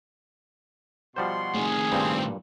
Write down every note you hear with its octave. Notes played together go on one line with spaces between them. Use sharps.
B2 F3 G3 F#4 C5 C6
A2 D#3 G#4
G2 A#2 C4